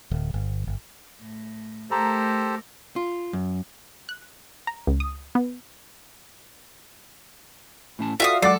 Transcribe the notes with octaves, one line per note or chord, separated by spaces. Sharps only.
D1
G1
G1
A2
A3 G4 A4 A#4 C5 A#5
F4
F#2
F#6
A#5
C#2
D#6
B3
A2 C#4 A5
F4 F#4 A4 D5 E5 F5 D#6
F#3 G#3 A4 D5 F#5 D6 A6 C7